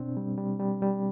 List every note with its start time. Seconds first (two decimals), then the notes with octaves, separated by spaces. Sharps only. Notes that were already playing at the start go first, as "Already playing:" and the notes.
Already playing: B2 C4 D4
0.17 G3
0.38 G3
0.60 G3
0.82 G3